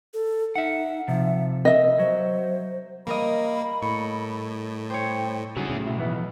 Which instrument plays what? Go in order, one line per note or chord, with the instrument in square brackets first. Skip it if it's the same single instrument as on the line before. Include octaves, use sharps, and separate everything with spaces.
[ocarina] A4
[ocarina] D#4 [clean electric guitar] E5 F#5
[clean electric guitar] C3 F3 [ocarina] E5
[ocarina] A#4 [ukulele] D#5 E5
[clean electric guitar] F#3 [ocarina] C5
[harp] G3 A#4 D#5 [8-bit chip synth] A#3 [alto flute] B5
[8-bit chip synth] A2 [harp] C#6
[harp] C5 C#5 [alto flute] G5
[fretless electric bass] C#3 [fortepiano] F#3 [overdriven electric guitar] E4 G#4
[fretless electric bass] A2 C#3
[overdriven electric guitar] B1 [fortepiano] E4
[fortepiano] F2 B3 E5 [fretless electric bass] E3